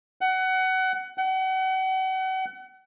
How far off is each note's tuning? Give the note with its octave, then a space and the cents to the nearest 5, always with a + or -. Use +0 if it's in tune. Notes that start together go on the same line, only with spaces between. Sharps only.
F#5 +20
F#5 +35